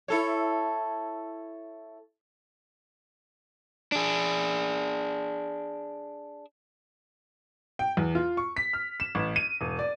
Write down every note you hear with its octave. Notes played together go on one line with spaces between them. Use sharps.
E4 A4 C#5
D4 G#4
G5
E2
F4
C#6
B6
F6
E7
A1
D#7
E1
D5